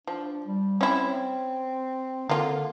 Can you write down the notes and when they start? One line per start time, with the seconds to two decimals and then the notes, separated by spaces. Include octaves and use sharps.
0.07 F3 D4
0.46 G3
0.81 C4 C#4 E4
2.29 D3 A#3 F4